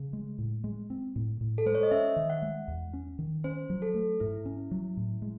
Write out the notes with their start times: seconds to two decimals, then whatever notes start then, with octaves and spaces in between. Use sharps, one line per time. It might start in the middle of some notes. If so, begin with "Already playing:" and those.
Already playing: C#3
0.13 G#3
0.38 A2
0.64 G#3
0.90 C4
1.16 A2
1.41 A2
1.58 A4
1.66 G#3 C5
1.75 C#5
1.83 D#5
1.91 C#4 E5
2.16 D#3
2.30 F#5
2.42 G#3
2.68 E2
2.93 C#4
3.19 D#3
3.44 C#4 C5
3.70 F#3
3.82 A4
3.94 A3
4.20 G#2 E4
4.46 C#4
4.71 F#3
4.97 A2
5.22 G#3